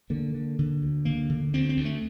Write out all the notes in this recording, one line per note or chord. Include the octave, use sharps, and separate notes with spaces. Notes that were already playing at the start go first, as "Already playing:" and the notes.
D3 A#3
D3
D3
D2
D3 A#3
D3
D2 C4
C4
D2
A3